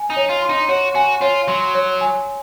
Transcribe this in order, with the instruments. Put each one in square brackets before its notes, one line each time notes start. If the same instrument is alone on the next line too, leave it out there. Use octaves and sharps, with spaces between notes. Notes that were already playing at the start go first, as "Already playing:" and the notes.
Already playing: [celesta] G#5
[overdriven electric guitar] D#4
[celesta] C#5
[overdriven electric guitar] F4
[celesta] C6
[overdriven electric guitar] D#4
[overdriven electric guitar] F#4 [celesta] C#5
[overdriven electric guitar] F#4 [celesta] G#5
[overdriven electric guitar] F4 [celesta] C#5
[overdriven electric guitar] F#3 [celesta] C6
[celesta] C#5
G#5